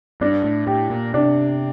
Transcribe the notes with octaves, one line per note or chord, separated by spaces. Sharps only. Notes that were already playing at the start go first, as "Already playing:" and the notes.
G2 D4
A2
A2 G4
A#2
C3 D4